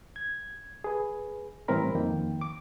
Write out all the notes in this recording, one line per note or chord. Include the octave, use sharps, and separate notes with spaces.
G#6
G#4 B4
A2 E3 G3 C4 A#4 B5
F2 D#3 F3 A#3 G5
D6